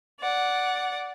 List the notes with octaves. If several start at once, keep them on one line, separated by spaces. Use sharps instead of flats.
D5 F#5